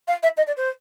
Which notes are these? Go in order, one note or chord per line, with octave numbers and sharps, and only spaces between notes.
F5
E5
D#5
D5
C5